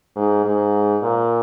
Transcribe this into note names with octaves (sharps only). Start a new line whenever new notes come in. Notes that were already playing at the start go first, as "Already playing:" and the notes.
G#2
G#2
A#2